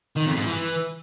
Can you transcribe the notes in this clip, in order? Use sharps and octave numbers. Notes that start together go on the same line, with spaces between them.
D#3
F2
G#2
E3